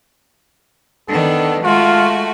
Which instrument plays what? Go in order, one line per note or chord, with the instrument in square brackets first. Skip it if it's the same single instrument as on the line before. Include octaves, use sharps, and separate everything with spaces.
[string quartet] D#3 B3 D4 [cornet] A4
[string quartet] G#3 A3 F#4 [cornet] F4